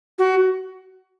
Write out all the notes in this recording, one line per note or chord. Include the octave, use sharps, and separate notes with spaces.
F#4